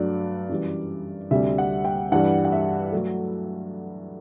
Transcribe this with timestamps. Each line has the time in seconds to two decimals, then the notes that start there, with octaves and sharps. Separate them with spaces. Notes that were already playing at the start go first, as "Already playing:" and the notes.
Already playing: G2 F#3 A3 D5
0.49 F#2 E3 G3
1.31 D2 C3 G3 E5
1.58 F#5
1.85 G5
2.12 G2 E3 G3 F#5
2.45 F#5
2.52 E5
2.92 F#3 A3 A4